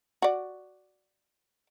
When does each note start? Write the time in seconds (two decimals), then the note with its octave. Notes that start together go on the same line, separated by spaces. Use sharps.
0.22 F#4 D5